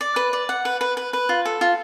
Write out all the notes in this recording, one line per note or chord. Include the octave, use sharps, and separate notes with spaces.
D5
B4
D5
F#5
B4
B4
B4
B4
F4
A4
F4